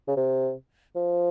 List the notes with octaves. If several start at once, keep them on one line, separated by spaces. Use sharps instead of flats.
C#3
C3
F3